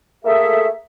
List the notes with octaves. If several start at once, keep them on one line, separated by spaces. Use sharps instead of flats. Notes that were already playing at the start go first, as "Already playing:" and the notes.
A3 A#3 G#4 A4 E5